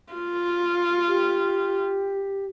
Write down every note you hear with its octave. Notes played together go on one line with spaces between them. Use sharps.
F4
G4